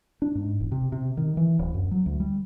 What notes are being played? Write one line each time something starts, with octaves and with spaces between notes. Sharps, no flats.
D4
G#2
E1
C3
C3
D#3
E3
D1
F#2
F#3
D2
G3